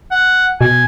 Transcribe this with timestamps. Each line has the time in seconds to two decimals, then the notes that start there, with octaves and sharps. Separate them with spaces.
0.11 F#5
0.61 B2 G#5